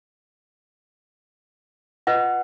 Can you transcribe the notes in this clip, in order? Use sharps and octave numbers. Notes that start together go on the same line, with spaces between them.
F4 B4 D#5 F#5